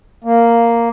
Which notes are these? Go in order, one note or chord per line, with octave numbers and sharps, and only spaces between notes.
A#3